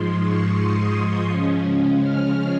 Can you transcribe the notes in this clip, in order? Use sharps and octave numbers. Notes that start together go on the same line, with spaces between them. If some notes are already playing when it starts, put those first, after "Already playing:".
Already playing: G#2 F3 G#3 C6
C#6
D#6
C#3 F3 G#3 C#4
F6